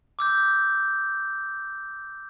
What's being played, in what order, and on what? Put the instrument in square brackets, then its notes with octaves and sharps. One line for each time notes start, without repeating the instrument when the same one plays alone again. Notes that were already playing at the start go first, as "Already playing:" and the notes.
[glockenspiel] D6 E6 G6